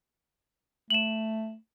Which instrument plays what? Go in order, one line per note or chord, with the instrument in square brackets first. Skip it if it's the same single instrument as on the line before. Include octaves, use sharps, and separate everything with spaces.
[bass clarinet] A3 [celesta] E7 F#7